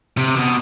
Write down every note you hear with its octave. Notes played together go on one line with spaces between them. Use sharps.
C3
B2